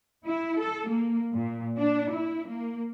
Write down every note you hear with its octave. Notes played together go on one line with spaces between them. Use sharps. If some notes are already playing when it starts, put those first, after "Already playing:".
E4
A4
A#3
A#2
D4
E4
A#3